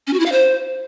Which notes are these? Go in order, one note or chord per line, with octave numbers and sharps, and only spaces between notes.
C#4
F#4
E4
F5
C5